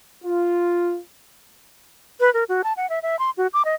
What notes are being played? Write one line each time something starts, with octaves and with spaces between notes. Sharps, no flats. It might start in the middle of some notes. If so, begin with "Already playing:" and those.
F4
B4
A#4
F#4
A5
F#5
E5
E5
C6
F#4
D6
D#5